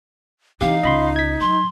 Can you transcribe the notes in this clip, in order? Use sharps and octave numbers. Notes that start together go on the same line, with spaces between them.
E3 C4 D#4 G4 F5
C#2 D#5 B5 C6
G#6 B6
F#3 C6